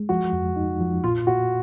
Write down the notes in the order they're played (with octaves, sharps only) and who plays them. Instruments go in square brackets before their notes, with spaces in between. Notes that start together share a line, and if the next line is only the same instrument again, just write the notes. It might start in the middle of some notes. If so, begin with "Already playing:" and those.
Already playing: [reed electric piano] G#3
[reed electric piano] F3 [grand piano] F#4
[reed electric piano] F2
D#4
F3
[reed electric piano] A#2 [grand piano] F4
[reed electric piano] A#2 [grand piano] F#4